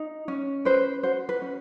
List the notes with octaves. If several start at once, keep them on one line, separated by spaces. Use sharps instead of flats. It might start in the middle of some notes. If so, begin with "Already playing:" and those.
Already playing: D#4
C#4
B4 C5
F#4 C5
B4
C#4